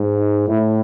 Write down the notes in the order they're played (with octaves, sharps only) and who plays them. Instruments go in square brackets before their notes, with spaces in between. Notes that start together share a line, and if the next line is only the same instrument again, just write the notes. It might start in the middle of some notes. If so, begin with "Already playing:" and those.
Already playing: [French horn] G#2
[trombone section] D#4
[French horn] A2 [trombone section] E4